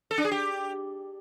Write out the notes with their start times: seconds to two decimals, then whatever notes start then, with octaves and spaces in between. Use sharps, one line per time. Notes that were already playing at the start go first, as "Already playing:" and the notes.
0.11 A4
0.18 D4
0.25 G#4
0.31 G4